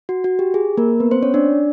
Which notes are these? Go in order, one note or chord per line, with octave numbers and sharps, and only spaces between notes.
F#4
F#4
G4
G#4
A#3 A#4
B3 B4
C4 C5
C#4 C#5
D4 D5